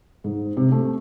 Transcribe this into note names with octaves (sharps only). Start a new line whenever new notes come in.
G#2
C3
A3